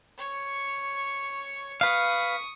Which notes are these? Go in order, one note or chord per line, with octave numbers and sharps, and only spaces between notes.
C#5 C#6
B4 F5 C#6 D#6